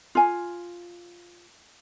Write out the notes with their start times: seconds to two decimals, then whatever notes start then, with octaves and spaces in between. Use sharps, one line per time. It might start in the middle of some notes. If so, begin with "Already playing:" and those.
0.15 F4 G#5